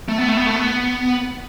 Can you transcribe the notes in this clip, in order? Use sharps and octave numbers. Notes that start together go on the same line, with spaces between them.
A3
B3
A3
B3
A3
B3